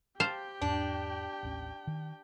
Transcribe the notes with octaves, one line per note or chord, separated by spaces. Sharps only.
G4 C5 F5 G5 A5
E2 G#2 D4
A1 D#2 C#4
D#3